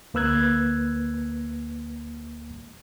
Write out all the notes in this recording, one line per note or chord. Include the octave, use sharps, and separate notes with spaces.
D2 A#3 B4 E6 F#6 G#6